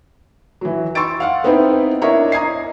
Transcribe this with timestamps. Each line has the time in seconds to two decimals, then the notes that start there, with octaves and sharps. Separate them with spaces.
0.61 E3 F#3
0.95 C6 C#6 E6 A6 D7
1.20 F5 F#5 F6
1.44 B3 C4 D#4 E4 B4
2.01 D4 E4 A#4 C#5 D#5
2.32 A#5 D#6 G#6 C7